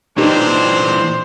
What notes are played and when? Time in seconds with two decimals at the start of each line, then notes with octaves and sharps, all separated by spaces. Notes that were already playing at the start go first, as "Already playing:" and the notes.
0.18 A#2 E3 D4 D#4 G4 A#4 C5